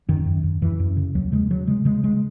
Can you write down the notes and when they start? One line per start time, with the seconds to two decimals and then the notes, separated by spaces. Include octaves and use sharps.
0.08 F#2 D#3
0.26 F#2
0.43 F#2
0.62 F#2 E3
0.80 F#2
0.97 C#3
1.15 D#2 F#3
1.32 C#3 G#3
1.51 C#3 F#3
1.67 C#3 G#3
1.85 C#3 G#3
2.04 C#3 G#3